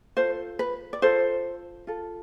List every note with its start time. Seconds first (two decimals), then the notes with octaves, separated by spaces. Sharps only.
0.17 F4 A4 C5
0.59 B4
0.93 D5
1.02 F4 A4 C5
1.87 F4 A4